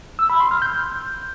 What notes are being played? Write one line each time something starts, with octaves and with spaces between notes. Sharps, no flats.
E6
B5
C6
F6
G6